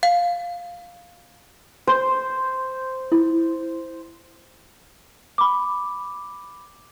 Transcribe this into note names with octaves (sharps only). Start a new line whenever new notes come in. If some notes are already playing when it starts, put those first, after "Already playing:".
F5
C5
E4
B5 D6